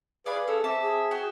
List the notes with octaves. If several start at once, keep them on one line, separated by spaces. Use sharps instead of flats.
G#4 B4 D5 F5 G#5 B5
C#4 G#4 A4 E6
C4 E5 A5 D6
G#4
F#4 G5